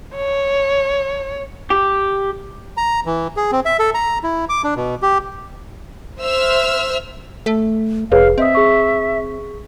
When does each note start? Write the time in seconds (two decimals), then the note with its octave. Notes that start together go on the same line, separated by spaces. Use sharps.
0.16 C#5
1.70 G4
2.77 A#5
3.05 E3
3.37 G#4
3.52 C4
3.66 E5
3.79 A4
3.94 A#5
4.24 E4
4.49 D6
4.64 D4
4.76 B2
5.02 G4
6.22 C5 E5 E6 F6
7.46 A3
8.12 F1 G#4 B4 C#5 F5
8.38 C4 D#5 E5 D#6
8.55 G#4 C#6